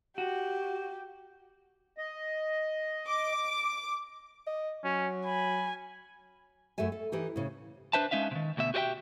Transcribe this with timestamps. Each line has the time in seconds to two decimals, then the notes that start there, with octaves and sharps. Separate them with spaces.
0.18 F#4 G4
1.98 D#5
3.07 D6
4.47 D#5
4.84 F#3 C#4
5.25 G#5 B5
6.78 F#2 A3 G#4 E5 G#5
6.92 A4
7.12 E3 D#4 G4
7.36 A2 C#3
7.93 D4 B4 C5 E5 A5
8.11 G#3 C#4 D#4 E5 F5
8.31 C3 D#3
8.57 D2 B2 E5
8.74 F#4 G4 B4 D#5 E5 G5